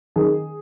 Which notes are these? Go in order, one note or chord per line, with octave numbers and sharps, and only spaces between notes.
D#3 G#4